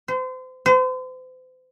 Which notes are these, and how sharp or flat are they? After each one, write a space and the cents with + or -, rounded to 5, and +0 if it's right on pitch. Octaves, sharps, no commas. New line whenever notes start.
C5 -35
C5 -40